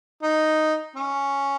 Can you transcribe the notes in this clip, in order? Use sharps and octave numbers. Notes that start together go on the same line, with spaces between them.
D#4
C#4